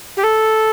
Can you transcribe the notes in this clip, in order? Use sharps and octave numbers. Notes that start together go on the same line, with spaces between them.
G4
A4